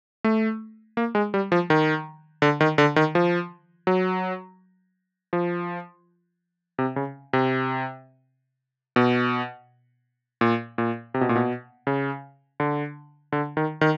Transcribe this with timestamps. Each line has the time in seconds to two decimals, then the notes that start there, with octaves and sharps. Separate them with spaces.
0.24 A3
0.97 A#3
1.15 G#3
1.34 G3
1.52 F3
1.70 D#3
2.42 D3
2.61 D#3
2.78 D3
2.96 D#3
3.15 F3
3.87 F#3
5.33 F3
6.79 C3
6.96 C#3
7.33 C3
8.96 B2
10.41 A#2
10.78 A#2
11.14 C3
11.21 B2
11.29 A#2
11.36 B2
11.87 C#3
12.60 D3
13.32 D3
13.57 D#3
13.81 D#3